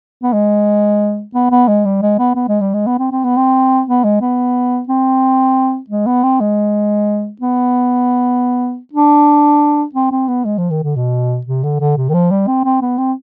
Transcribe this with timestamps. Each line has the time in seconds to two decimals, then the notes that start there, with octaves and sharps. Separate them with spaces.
0.23 B3
0.33 G#3
1.35 B3
1.51 B3
1.68 G#3
1.85 G3
2.02 G#3
2.19 B3
2.36 B3
2.48 G#3
2.61 G3
2.74 G#3
2.87 B3
2.99 C4
3.12 C4
3.24 B3
3.37 C4
3.87 B3
4.04 G#3
4.21 B3
4.88 C4
5.90 G#3
6.06 B3
6.24 C4
6.41 G#3
7.42 B3
8.93 D4
9.94 C4
10.11 C4
10.28 B3
10.45 G#3
10.58 F3
10.71 D#3
10.83 D3
10.96 B2
11.46 C3
11.63 D3
11.80 D3
11.97 C3
12.09 D#3
12.14 F3
12.31 G3
12.47 C4
12.64 C4
12.82 B3
12.98 C4